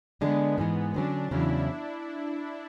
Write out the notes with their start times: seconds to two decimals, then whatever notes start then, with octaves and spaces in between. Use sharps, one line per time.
0.21 D3 G#3 B3 D4 G#4
0.58 G#2 E3 G#3
0.94 D3 F#3 C#4 D4
1.31 E2 C#3 F#3 C#4 E4